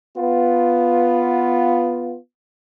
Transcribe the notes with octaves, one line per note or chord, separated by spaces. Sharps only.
B3 F4